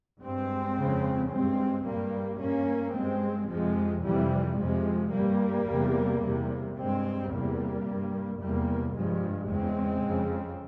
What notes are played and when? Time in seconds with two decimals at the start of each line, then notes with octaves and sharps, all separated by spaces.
0.22 G2 G#3 C4
0.78 F2 C#3
1.31 G2 G#3 C4
1.86 G2 G3 A#3
2.40 G2 A#3 C#4
2.95 G2 G#3 C4
3.50 F2 C3 F3 G#3
4.04 F2 C3 E3 G3
4.58 F2 C3 F3 G#3
5.13 G2 G3 A#3
5.68 E2 C3
6.22 E2 C3
6.77 G2 G#3 C4
7.31 E2 C3 G3 A#3
7.86 G2
8.40 E2 C3 G3 A#3
8.95 G2 F3 G#3
9.49 E2 C#3 G#3 C4
10.04 F2 C#3